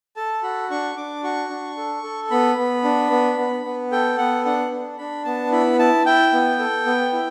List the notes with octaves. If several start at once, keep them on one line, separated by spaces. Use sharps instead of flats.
A4 A5
F#4 B5
D4 C#6
D4 D6
F#4 C#6
D4
A4
A4
B3 B5
B3
D4
B3
B3
B3
A4 G5
B3 F#5
D4 F#5
D4
D4 B5
B3 A5
E4 B5
E4 A5
E4 G5
B3
A4
B3
E4